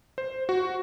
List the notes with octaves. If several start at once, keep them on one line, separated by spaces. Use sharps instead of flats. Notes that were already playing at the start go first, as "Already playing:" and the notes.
C5
F#4